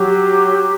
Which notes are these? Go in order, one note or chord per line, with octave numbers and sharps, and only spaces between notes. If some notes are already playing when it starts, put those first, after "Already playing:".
Already playing: F#3 G4